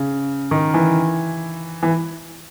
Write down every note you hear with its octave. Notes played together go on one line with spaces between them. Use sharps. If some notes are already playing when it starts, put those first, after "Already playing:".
Already playing: C#3
D#3
E3
E3